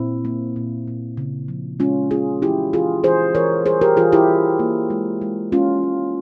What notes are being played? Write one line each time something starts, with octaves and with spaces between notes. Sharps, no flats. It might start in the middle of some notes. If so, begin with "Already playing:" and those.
Already playing: A#2 C4 E4
A#3
A#2
A#2
C#3
F3
G#3 C#4 F4
C#3 F4 G#4
E3 E4 G4
E3 F4 G#4
E3 G#4 C5
E3 A#4 C#5
G3 G#4 C5
G4 A#4
E3 F4 G#4
E4 G4
E3
A#3
G#3
G#3
G#3 C#4 F4
G#3